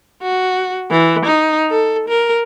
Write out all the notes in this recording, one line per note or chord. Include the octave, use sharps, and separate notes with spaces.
F#4
E3
D#4
A4
A#4